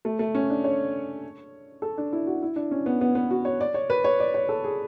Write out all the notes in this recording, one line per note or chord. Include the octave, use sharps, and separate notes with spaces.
A3
A3
C#4
D4
C#5
A4
D4
E4
F#4
E4
D4
C#4
B3
B3
B3
F#4
C#5
D5
C#5
B4
C#5
D5
C#5
A4
G#4